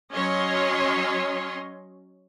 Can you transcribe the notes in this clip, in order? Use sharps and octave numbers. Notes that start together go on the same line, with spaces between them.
F#3 C#4 C#5 D#5 C6